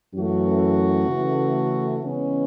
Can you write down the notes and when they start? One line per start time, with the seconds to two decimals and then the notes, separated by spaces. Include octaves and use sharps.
0.14 F#2 E3 A3 F#4
1.09 C#3 E3 A3
2.03 C#3 E3 G#3 B3 C#4